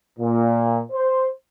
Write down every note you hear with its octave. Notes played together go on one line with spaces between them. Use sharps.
A#2
C5